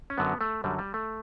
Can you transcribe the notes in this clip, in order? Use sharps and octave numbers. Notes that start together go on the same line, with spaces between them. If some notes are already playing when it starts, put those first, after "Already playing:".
C#4
F#2 D3 F#3 B3
A3
F#2 D3 F#3 G3
G3
A3